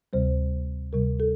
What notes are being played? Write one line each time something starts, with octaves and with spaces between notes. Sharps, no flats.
D2 C3 G3 C5
D2 C3 G3 A#4
A4